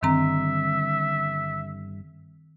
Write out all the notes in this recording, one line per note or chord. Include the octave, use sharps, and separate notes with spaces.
G1 G2 D3 D#3 C4 E5 A#5